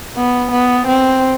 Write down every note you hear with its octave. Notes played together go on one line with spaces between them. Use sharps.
B3
B3
C4